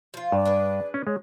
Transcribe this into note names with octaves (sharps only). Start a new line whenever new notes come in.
F3 F4
G2 D5
D4 G#4 B4
C#4
G#3 C#5